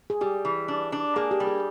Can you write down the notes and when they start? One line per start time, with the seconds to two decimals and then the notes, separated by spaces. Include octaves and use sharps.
0.10 G#4
0.21 G3 G4
0.45 E3
0.68 D4
0.92 D4
1.16 A#3 G#4
1.31 G4
1.40 G3
1.47 G#4